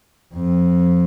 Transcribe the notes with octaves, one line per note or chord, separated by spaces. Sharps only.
F2